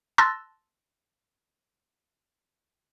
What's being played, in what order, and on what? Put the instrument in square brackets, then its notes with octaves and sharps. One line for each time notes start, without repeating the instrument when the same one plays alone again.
[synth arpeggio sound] A5 C6 E6 F#6 A6 A#6